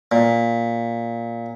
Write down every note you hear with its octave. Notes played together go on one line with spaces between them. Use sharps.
A#2